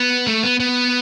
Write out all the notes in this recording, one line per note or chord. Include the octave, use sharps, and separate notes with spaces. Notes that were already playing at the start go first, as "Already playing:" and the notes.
Already playing: B3
A3
B3
B3